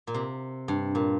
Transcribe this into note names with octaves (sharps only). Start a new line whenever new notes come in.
A#2
C3
G2
A#2